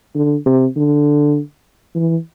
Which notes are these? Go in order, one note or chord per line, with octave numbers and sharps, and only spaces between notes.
D3
C3
D3
E3